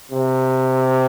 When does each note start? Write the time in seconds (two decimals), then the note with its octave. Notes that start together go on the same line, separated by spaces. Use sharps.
0.11 C3